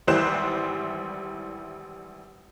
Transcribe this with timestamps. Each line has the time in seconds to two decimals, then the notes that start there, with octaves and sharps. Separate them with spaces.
0.07 G#1 E3 G3 C5 F#6 E7